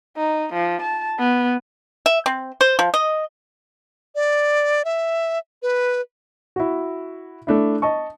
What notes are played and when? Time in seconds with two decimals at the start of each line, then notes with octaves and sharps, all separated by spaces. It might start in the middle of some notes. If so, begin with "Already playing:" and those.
0.17 D#4
0.54 F3
0.82 A5
1.19 B3
2.06 E5
2.26 C4
2.61 C5
2.79 F3
2.94 D#5
4.15 D5
4.85 E5
5.62 B4
6.56 E4 F#4
7.47 A3 D4 E4
7.82 D#5 A5 C#6